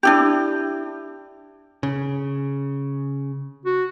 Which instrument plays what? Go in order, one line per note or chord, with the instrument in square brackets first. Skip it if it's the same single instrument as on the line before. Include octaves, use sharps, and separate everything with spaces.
[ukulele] D4 E4 G4
[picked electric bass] C#3
[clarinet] F#4